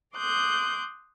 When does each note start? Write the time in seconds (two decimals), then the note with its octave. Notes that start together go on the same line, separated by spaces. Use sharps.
0.16 C6 D6 D#6 F#6 G6